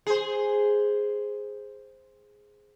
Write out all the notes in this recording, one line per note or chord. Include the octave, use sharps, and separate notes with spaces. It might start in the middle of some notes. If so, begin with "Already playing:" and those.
G#4 C5